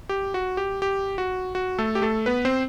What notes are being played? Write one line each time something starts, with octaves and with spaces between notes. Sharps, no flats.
G4
F#4
G4
G4
F#4
F#4
A3 A4
G4
A3 A4
B3 B4
C4 C5